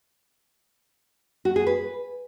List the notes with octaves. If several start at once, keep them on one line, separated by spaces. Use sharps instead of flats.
F#4
G#4
B4